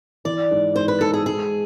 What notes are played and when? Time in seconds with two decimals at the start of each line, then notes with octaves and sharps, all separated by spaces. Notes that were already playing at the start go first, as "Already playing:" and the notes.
0.25 E3 D5
0.51 G#2
0.75 G#2 C5
0.88 B4
1.01 G#2 A4
1.14 G#4
1.26 G#3 G#4